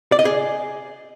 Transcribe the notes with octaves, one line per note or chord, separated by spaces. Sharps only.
D5
D#5
G#4